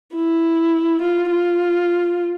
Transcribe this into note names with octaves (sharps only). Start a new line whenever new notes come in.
E4
F4
F4